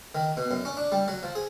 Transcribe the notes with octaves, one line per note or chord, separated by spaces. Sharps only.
D#3
B2
F#2
C#4
D4
G3
F#3
F3
G#4